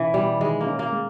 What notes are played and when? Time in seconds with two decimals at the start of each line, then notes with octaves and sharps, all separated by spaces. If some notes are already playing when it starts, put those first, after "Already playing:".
Already playing: B2 E3 C#4
0.14 B2 G3
0.40 D#3 G#3
0.61 A#3
0.67 C#4
0.79 A#3
0.93 G#3